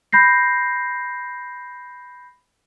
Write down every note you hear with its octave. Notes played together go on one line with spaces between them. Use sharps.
B5 G6 A#6 C7